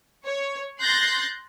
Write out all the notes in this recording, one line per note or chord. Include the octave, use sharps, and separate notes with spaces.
C#5
C6 F#6 G6 A6 A#6 C7